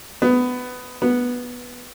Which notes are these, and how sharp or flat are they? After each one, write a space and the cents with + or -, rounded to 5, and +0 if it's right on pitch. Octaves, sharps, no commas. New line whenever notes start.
B3 +15
B3 -10